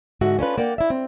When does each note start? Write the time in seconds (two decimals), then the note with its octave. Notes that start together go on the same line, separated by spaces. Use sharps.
0.21 G#2 D3 F#4 E5
0.39 C#4 D4 F4 B4
0.58 A#3 D5 F#5 G5
0.78 E4 E5
0.90 C4